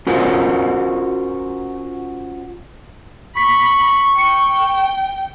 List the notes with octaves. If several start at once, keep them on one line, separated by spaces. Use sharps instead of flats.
C#4 F4 F#4 A#4 C5
B5 C#6 B6
G5 C#7